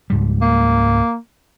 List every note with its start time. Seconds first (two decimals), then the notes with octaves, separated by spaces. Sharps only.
0.10 C#2 G#2 G3
0.42 A#3